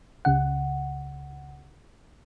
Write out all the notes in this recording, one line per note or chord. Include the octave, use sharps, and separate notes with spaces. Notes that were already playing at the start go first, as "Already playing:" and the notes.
C#2 C#3 F#5